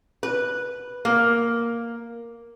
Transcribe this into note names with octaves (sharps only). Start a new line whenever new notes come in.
B4
A#3